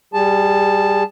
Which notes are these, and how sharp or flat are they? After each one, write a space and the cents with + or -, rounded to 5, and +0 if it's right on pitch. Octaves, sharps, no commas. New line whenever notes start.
G3 +0 G#4 -25 A5 +0